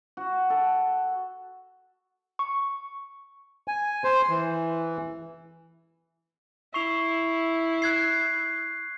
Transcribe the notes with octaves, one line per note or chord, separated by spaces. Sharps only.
F#4
A4
C#6
G#5
C5
E3
E4 C#6 C7 F7
F#6 G#6 C7